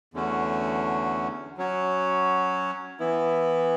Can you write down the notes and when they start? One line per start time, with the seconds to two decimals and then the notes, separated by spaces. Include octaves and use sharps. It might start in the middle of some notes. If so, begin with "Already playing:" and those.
0.14 E2 D3 A3 C#4 F#4
1.57 F#3 C#4 F#4 C#5
2.99 E3 B3 E4